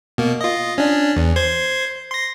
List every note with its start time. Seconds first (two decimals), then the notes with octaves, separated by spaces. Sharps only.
0.18 B2 A#3
0.41 F4 D#5
0.78 C#4 D4
1.16 E2
1.36 C5 C6 G#6
2.12 C6 A#6